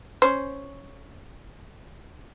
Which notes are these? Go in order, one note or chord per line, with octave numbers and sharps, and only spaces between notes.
C#4 C5